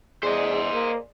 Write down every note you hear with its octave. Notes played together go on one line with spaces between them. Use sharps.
E2 G#4 C5 D5 D#5
A#3